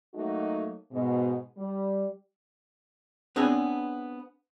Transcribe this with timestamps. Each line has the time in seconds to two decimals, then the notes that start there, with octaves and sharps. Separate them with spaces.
0.15 F#3 A3 A#3 D#4 F#4
0.92 G#2 B2
1.57 G3
3.36 B3 C4 D4 G#4 B4 C#5